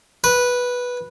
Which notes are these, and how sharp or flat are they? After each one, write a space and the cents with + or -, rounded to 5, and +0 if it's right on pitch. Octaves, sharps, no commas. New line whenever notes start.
B4 -10